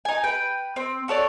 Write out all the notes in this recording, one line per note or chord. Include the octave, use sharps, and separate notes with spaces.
D#4 G#5
B4 G5
C4
F#4 A4 C#5 D5